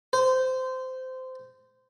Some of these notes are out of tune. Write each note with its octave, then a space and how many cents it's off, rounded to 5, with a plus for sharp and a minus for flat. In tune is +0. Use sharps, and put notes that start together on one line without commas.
C5 -20